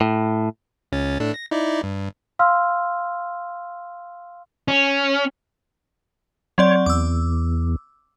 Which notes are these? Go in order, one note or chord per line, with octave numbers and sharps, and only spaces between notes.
A2
C#2 C#4 A6
A2 D4 A4
A#6
D#4 E4 D5
G2
F5 C6 E6 F6
C#4
F#3 C4 C#5 D5
E2 D6 E6